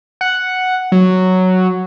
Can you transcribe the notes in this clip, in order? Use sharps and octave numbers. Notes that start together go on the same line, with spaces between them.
F#5
F#3